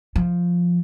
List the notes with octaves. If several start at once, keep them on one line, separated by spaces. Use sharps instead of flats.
F3